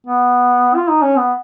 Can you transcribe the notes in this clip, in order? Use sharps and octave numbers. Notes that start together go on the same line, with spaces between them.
B3
F4
D#4
C#4
B3